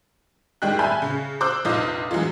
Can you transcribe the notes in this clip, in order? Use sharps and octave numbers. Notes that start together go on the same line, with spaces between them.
D#3 G3 G#3 G5 F#6
E5 G#5 A5 B5 F6 G6
C#3
C5 D6 E6 F#6 G6
F1 A#1 D#4 F4 D#6 G6
E3 F#3 G#3 F4